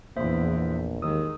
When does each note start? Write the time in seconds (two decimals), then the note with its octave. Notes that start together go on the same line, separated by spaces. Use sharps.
0.16 A#1 E2 A#3 C5 E5
1.02 D#2 D#3 G#3 D#6 E6